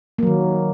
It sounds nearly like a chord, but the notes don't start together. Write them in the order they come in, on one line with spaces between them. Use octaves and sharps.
A#3 F#3 D#3